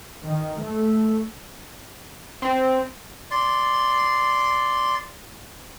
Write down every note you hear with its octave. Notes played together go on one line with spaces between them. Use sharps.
D#3
A3
C4
D5 C6